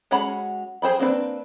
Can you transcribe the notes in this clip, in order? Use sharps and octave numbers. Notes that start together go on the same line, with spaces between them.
G#3 C#4 F#4 F#5 B5
G#4 C5 G5 B5
A#3 C4 D4 B4